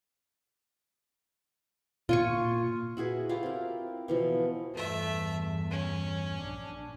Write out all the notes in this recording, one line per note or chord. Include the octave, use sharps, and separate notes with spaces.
A#2 F4 G#5 C#6
E4 F#4 G#4 B4
E4 F4 G4
C4 A#4
B2 E3 F3
E2 G2 A3 E5
C#4
A#1 D4